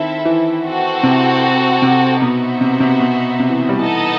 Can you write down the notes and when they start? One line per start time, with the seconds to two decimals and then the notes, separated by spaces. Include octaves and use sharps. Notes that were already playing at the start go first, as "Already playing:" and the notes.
Already playing: D#3 C4 E4 A4 E5
0.25 E3
0.64 C4 F#4 A4
1.03 C3
1.82 C3
2.21 B2 B3 D#4 F#4 C5 E5
2.61 C3
2.80 C3
3.00 B2
3.40 C3
3.50 E3
3.69 G3
3.79 E3 B3 D#4 A4 D#5 A5